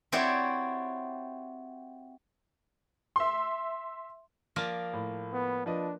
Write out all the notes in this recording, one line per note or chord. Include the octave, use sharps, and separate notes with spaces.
C4 E4 F#4 G4 C#5 D5
E5 C6
F3 A#3 D5
A2
B3
F3 D4 B4 D#5